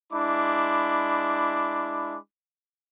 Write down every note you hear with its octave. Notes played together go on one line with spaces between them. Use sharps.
G#3 D4 E4 B5 D6